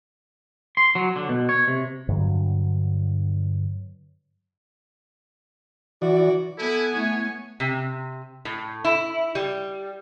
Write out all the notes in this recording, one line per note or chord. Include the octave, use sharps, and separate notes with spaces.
C6
F#3
D3
B2
C#5
C3
G2 D3 F#3
E3 F#4 D5
B3 E4 A4 G#5
A3 E4 C#5
C3
A2
E4
G3